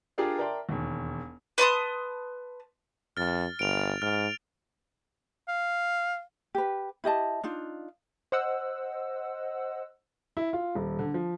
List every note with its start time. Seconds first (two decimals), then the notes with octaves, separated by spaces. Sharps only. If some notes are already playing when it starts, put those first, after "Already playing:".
0.18 D4 F4 G4 G#4 A#4 D5
0.38 A#4 D5 E5 G5 A5 C6
0.69 E1 D#2
1.58 B4 A5 C6 D#6
3.17 F2 F6 A6
3.59 G1 D7 F7
4.02 G#2 F6
5.48 F5
6.55 G4 B4
7.04 E4 G4 D#5 A5
7.43 D4 D#4 F4
8.32 C5 D#5 F#5 E6
10.37 E4
10.53 F4
10.75 D#1
10.99 D3
11.14 F3